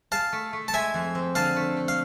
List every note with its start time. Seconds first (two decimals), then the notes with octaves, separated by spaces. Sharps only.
0.12 G#4 F5 A5
0.32 A3
0.53 A3
0.68 A5
0.73 G#3 E5 G#5
0.94 F2
1.15 C4
1.35 D3 F5 A5
1.56 A3
1.77 A3
1.88 F5